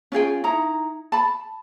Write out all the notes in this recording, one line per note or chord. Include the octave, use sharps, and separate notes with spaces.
C#4 F4 G#4 G5
D#4 E4 A#5
A5 B5